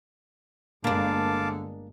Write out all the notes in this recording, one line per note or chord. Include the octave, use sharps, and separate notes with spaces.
G1 D3 G#3 A#3 D4 F5 A5 D6